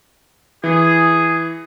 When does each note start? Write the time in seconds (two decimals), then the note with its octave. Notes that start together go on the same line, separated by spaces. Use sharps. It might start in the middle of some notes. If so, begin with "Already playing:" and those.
0.64 E3 G#4